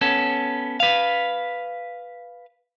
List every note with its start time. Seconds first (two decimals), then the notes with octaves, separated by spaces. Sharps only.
0.01 B3 C#4 A4
0.80 B4 F5